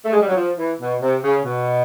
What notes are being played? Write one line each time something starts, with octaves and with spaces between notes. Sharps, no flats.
A3
G#3
G3
F#3
F3
E3
B2
C3
C#3
B2